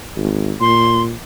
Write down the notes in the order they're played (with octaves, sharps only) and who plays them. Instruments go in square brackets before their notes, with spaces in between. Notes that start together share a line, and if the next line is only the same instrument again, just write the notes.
[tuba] G#1
[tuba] A#2 [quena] C6